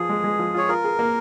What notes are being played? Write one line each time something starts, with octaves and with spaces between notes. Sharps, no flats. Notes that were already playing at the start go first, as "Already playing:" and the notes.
Already playing: F3 F4 G#4
G#3
G#3
F3
F4 C#5
F4 A#4
G#4
A#3